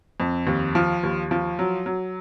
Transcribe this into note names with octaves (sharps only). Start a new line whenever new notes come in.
F2
D#2
F3
D#2
F3
F#3
F#3